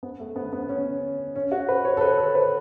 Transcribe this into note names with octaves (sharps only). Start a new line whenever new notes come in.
B3
A3
B3
B3
C#4
C#4
F#4
B4
C#5
A4
B4
A4
B4